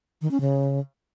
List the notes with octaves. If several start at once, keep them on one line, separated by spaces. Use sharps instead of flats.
D#3
C#4
C#3